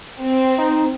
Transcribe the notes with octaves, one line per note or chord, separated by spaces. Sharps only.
C4
D#4